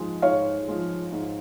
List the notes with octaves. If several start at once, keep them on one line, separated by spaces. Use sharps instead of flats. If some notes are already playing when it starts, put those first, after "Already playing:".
Already playing: G#2 F3 G#3
G#2 C#5 F5
F3 G#3
G#2